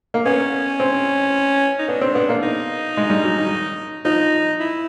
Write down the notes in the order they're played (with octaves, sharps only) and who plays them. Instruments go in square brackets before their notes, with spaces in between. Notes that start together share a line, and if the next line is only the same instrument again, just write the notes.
[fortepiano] A#3
[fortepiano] B3 [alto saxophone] C#4
[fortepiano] C4
[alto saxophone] D#4
[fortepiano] B3 [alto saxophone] D4
[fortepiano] C4
B3
A#3
[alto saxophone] D#4
[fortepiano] G#3
G3
F#3
D#3
[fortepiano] F3 [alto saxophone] D#4
[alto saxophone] E4